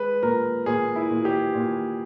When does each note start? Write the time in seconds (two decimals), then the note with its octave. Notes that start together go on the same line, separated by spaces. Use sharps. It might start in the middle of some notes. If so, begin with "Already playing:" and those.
Already playing: G#3 B4
0.23 A#2 A#4
0.66 A#2 G#4
0.96 E4
1.10 A#2
1.25 G4
1.55 A#2